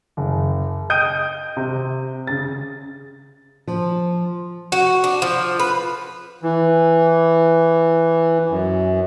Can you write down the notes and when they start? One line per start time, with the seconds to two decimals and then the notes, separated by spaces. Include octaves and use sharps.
0.17 F#1
0.90 D#5 G5 D#6 G6 D7 D#7
1.57 C3
2.27 C#3 A6
3.67 F3
4.72 F#4
5.04 D4
5.22 F3
5.59 B4
6.43 E3
8.50 F#2